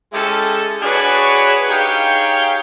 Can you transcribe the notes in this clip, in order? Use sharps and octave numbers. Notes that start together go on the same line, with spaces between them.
G#3 C#4 E4 G4 A4
D4 F#4 G#4 B4 C#5
D#4 G4 G#4 C#5 F5 G5